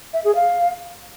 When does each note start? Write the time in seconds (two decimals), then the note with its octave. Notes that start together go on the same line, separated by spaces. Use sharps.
0.14 E5
0.24 G#4
0.35 F5